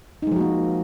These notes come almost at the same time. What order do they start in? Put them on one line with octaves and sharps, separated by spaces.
D#4 G#3 F3 F#4 A#3